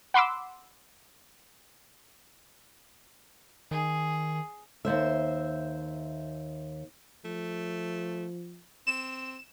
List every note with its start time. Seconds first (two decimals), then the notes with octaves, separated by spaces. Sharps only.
0.14 F#5 B5 C6 D6 E6
3.71 D#3 G#4
4.85 D#2 G#2 C5 E5
7.25 F3 A3
8.87 C4 E7